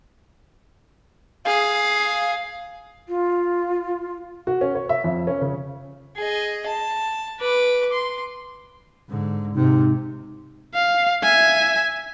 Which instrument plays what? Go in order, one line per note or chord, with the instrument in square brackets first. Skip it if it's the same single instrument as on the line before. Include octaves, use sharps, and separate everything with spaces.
[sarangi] G#4 [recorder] F5
[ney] F4
[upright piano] F#4
C#4
C#5
E5
F2
C#4
C#3
[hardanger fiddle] G#4 D#5
A5
B4 D6
C6
[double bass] G#2 D3
[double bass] G#2 C3 [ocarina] D#4
[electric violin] F5
E5 G#5